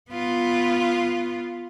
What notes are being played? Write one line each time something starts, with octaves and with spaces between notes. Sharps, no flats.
B3 F4